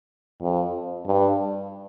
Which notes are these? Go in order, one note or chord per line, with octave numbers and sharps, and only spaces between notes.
F2
G2